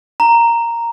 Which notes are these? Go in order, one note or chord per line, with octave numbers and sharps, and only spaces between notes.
A#5